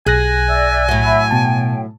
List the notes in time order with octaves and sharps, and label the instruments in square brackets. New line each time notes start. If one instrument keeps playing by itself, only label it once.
[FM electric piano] B1 F#6 A#6 [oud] G#4 [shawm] G#5
[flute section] D5 E5 E6
[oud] A2 F#3 [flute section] E5
[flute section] E5 B5 E6
[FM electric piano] B2 A5 [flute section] G5